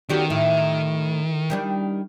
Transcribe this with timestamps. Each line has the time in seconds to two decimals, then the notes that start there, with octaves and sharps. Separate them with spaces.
0.09 D#3 B3 C#4 F#4 G4 A4 D5
0.30 A2 E4 F4 E5
1.50 D#3 G3 D4